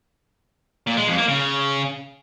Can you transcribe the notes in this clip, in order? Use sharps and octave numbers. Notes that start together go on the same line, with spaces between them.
A#2
G#3
F2
A#3
C#3